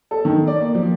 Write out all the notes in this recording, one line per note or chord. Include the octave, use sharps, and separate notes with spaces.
A4
D#3
D5
A#3
F3